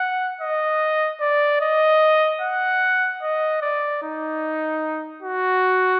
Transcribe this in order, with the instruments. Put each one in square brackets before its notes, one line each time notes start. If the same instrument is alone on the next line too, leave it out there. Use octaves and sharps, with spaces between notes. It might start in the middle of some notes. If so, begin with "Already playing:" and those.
Already playing: [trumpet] F#5
D#5
D5
D#5
F#5
D#5
D5
D#4
F#4